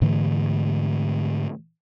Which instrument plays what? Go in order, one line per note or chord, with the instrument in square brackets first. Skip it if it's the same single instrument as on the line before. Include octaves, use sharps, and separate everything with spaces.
[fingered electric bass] G#2 D3 E3 A3